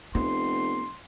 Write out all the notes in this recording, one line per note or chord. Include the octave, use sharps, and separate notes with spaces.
F1 B3 C6